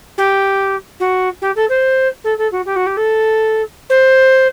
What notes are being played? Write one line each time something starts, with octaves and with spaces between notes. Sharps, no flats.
G4
F#4
G4
A4
C5
A4
A4
F#4
G4
F#4
G4
A4
C5